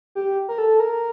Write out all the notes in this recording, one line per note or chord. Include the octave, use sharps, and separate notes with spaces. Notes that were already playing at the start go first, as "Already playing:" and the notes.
G4
A#4
A4
A#4